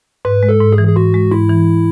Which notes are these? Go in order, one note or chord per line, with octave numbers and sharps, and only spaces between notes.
G#2 B4
G#3
A4
G#2
G#4
E3
G#4
G#2 F#4
G#3
G#2 E4
E3